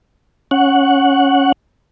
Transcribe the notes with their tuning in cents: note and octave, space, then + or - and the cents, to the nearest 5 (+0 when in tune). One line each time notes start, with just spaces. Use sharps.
C#4 +0 F#5 +0